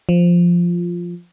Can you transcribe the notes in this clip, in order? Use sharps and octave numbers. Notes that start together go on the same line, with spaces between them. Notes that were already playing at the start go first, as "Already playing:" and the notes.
F3